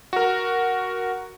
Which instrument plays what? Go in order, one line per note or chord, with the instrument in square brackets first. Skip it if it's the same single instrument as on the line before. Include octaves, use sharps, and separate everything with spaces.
[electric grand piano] F#4 A#4